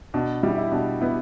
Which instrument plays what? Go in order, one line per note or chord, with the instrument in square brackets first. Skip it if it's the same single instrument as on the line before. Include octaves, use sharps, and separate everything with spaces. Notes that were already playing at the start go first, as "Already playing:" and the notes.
[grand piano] B2 [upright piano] D4
[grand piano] G3 [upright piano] E4
[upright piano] G4
E4
[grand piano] B2 [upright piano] D4
[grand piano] B3 [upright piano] E4